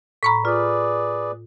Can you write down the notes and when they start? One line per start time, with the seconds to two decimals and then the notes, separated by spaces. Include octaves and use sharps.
0.23 A2 A#5 B5 C#6 B6
0.45 F4 G#4 B4 D5